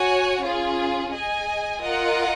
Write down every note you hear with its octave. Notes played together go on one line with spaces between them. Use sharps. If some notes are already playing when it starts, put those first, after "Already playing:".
Already playing: F#4 C#5 G#5
C#4 F4 G#4
G#4 D#5 G#5
F4 A#4 D#5 F#5